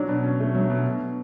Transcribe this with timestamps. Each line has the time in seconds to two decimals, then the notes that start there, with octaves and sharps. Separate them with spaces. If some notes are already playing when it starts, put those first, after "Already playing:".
Already playing: F#3 D4
0.08 B2
0.24 C#4
0.40 A3
0.55 F#3
0.70 B2
0.86 B2